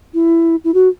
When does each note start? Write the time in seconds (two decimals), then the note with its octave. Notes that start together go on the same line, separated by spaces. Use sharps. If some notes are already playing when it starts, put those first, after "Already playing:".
0.14 E4
0.64 E4
0.74 F#4